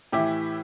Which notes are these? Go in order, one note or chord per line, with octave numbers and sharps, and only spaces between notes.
A2 E3 E4 G4